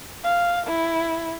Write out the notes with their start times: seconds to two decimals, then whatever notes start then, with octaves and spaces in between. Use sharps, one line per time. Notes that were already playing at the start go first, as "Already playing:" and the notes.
0.24 F5
0.67 E4